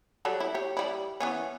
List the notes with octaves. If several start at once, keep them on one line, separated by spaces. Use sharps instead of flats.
F#3 G3 A4
E4
G4 C#5
G3 E4
E3 B3 C#4